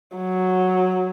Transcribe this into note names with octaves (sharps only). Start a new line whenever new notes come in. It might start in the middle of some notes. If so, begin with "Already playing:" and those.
F#3